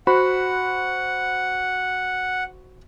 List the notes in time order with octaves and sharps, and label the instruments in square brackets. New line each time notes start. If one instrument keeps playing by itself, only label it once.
[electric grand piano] F#4 C5 B5 [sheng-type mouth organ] F#5